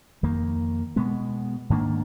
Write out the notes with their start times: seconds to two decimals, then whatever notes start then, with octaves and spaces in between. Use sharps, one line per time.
0.23 F2 D#3 A#3
0.96 B2 G#3 B3
1.70 G#2 D#3 A#3 D4